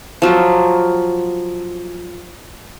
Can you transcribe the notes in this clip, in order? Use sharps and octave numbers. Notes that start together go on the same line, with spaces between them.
F3 F#3 F4